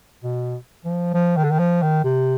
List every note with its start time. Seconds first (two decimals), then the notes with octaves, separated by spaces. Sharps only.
0.24 B2
0.85 F3
1.14 F3
1.37 D#3
1.44 D3
1.51 D#3
1.59 F3
1.82 D#3
2.04 C3